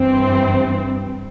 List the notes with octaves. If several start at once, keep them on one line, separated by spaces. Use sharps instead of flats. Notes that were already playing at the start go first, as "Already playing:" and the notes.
Already playing: G2 E3 C4